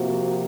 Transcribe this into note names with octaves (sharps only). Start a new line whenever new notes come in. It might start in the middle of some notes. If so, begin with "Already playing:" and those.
Already playing: C3 F3 A#3 F#4